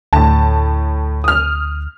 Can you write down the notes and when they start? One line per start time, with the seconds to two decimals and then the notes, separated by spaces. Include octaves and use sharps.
0.13 D2 A2 A5
1.24 D#6 F6